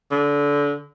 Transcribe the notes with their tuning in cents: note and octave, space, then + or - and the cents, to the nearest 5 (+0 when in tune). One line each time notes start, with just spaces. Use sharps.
D3 -25